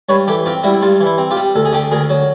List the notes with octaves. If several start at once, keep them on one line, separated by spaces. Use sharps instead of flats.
G2 B4 C#5
E3 G4 A4
C4 F4 G4
G3 E4 F#4
E4
G2 F4
E3
E4
C4
F4 G4
G3
D2 A4
G#4
D3 G4 A4
D2 G#4 A#4
F#3